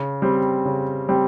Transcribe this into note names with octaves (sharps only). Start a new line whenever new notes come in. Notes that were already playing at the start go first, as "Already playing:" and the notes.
Already playing: C#3
G3 C4
C#3
G3 C4